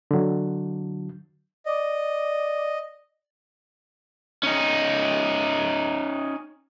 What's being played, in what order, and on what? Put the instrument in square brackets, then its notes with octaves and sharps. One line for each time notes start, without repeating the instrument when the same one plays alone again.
[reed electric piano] D3 F#3
[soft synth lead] D5 [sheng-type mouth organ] D#5
[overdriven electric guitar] C#4 D#4